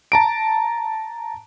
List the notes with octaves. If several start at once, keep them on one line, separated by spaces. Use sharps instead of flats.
A5 A#5 D7